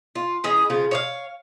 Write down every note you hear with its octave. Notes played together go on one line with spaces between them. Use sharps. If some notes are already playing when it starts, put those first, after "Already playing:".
F4
E3 C#4 G#4 D#5
C#3 F3 F4
C#5 D5 F5